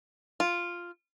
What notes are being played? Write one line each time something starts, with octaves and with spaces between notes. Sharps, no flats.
F4